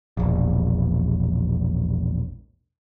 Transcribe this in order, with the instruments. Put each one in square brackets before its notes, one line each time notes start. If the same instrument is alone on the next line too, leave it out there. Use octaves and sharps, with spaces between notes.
[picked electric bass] E1 A#1